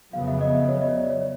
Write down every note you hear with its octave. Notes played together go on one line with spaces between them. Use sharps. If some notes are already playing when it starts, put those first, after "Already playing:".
F2 C#3 F#3 B3 F5
E5
D#5
E5
C#5
D#5
D5
C#5